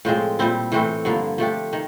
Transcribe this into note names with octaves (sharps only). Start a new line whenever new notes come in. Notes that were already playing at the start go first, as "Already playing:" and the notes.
A2 F3 G#3 C4
A#2 G3 C4 E4
A2 E3 A3 C4
G2 D3 F3 A#3
F3 A3 D4 G4
D#3